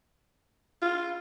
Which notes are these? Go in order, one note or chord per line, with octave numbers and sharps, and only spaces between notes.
F4